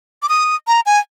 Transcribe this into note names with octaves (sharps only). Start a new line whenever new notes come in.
D6
D#6
A#5
G#5